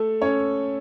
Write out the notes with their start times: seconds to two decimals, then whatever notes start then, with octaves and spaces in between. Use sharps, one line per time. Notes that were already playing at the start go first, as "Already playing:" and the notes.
Already playing: A3 A4
0.22 C#4 C#5